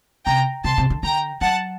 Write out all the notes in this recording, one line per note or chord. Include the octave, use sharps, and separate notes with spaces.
C3 G5 A#5
C3 A5 C6
C3
D3
D3 G5 A#5
F#3 F#5 A5